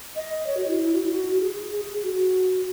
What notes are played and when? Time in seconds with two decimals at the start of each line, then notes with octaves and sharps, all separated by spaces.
0.16 D#5
0.47 C#5
0.57 F#4
0.67 E4
0.79 E4
0.94 F#4
1.03 E4
1.11 F#4
1.40 G#4
1.72 G#4
2.03 F#4